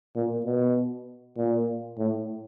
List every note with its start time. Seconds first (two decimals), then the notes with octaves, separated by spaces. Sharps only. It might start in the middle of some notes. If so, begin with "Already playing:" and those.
0.16 A#2
0.46 B2
1.37 A#2
1.98 A2